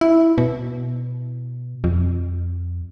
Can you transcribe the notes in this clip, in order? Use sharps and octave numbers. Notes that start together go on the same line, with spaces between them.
E4
B2
F2